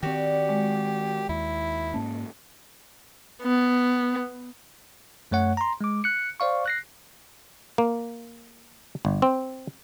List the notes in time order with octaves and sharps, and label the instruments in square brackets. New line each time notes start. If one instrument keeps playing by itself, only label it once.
[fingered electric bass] D#3 C4 [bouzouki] F#4 D5 [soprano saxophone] G4
[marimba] G#3
[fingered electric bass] D#2 [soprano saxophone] E4
[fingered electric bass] G#2 A#3 C#4 [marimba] A5
[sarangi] B3
[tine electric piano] F#2 A3 C#5 F#5
A#5 C6
G#3 D6
F#6 C#7
C5 D5 F5 C#6
F#6 A#6 C7
[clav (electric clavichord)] A#3
G1
C4